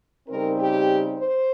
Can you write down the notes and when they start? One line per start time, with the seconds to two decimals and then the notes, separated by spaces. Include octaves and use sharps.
0.28 C#3 G3 C4 D#4 A#4
0.58 G4
1.16 C5